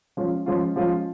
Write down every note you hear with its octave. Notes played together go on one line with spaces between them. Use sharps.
F3 G#3 C#4 F4
F3 G#3 C#4 F4
F3 G#3 C#4 F4